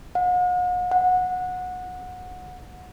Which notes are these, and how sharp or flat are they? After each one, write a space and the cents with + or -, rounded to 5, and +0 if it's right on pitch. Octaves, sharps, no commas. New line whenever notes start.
F#5 -45
F#5 -20